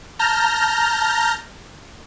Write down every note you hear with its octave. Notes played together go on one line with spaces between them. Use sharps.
A5 A#5 F6 G6 A#6